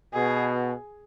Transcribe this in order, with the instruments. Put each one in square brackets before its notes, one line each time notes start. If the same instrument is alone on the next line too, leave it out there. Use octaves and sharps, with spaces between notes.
[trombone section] B2 [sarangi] G#4